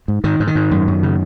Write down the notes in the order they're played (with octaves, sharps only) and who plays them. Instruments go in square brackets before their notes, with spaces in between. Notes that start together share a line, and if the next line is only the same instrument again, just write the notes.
[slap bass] G#2
G#2 D#3
G#2
D#3
G#2
F#2
F#2
C#3